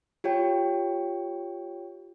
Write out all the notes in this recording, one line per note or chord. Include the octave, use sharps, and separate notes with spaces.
F4 G4 C#5 G5